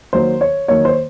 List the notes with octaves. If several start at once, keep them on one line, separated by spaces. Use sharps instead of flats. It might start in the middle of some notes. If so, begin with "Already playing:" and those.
D#3 F#3 A#3 C5
C#5
D#3 F#3 A#3 C#5
C5